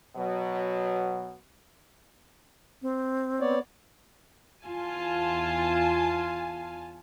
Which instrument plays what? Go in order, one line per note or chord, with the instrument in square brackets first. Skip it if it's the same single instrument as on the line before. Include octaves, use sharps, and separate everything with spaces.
[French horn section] B2 F#3
[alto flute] C4
[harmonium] B3 C#5 D5
[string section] E2 F4 G#5 A5